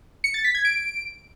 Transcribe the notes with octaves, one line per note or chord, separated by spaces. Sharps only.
C#7
A6
B6
G#6
D7